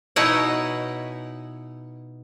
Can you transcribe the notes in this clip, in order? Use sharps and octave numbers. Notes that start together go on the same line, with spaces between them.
B2 D#4 E4 C#5 F#5